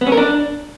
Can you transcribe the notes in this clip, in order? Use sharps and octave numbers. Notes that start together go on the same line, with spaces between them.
B3
C#4
A#4
D4